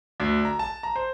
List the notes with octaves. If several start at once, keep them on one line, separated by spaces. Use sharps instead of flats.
D2
A#5
A5
A#5
C5